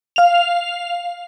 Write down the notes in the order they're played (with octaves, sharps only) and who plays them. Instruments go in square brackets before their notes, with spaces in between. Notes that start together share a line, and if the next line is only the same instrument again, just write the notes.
[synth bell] F5 F7